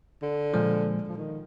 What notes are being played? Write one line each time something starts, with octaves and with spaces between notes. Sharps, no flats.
D3
A#2 F3 G#3
F3
D#3